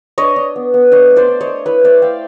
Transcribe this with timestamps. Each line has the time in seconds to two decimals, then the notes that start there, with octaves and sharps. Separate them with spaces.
0.18 D4 C#5 D#5
0.36 D4
0.56 B3
0.74 B3
0.92 D4 C#5 D#5
1.11 A3
1.16 C5 D5
1.28 D4
1.41 C#5 D#5
1.47 A3
1.66 E4 B4 C#5
1.84 A3 C5 D5
2.02 E4 F5 G5